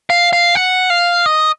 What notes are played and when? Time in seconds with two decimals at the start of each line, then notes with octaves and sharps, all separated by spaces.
0.10 F5
0.33 F5
0.55 F#5
0.90 F5
1.26 D#5